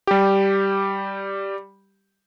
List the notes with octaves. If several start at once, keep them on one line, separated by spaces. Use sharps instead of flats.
G3 G4